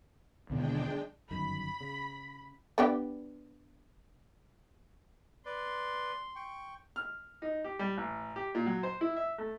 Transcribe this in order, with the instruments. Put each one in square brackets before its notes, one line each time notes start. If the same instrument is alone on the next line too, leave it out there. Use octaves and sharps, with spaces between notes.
[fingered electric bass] D#2 B2 D3 [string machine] G#3 D4 G5
[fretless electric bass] G1 F#2 D#3 [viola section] B5
[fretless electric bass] C#3
[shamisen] B3 D4 G4
[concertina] B4 D5 [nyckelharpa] C6
[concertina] G5 C#6
[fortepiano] F6
D#4
G4
G3
A1
G4
A#2
F#3
C5
E4
E5
A3